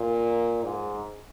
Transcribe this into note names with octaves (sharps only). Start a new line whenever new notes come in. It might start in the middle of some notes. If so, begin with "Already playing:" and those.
Already playing: A#2
G#2